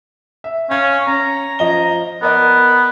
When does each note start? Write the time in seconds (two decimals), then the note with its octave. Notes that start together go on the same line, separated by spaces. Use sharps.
0.44 E5
0.70 C#4 F5 G#6
1.07 C#4 A#5
1.59 F3 D#5 G7
2.22 B3 A#4 D5 D#5